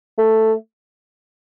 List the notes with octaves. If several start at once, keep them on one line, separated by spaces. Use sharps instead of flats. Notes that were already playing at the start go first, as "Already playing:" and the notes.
A3